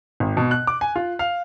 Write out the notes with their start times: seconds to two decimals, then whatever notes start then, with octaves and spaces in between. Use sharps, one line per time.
0.20 G#1
0.37 B2
0.51 F#6
0.67 D6
0.81 G#5
0.96 F4
1.19 F5